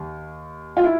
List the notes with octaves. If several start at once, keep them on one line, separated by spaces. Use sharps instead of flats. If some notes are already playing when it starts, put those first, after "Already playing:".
Already playing: D#2
F4
E4